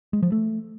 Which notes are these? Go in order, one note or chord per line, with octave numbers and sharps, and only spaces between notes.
G#3
F3
A3